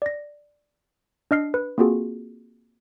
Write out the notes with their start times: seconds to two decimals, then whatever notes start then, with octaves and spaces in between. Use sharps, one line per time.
0.02 D5 A#6
1.31 D4 D#5 F6 C7
1.54 B4
1.78 A#3 C4 F4 F#4 G#4 A4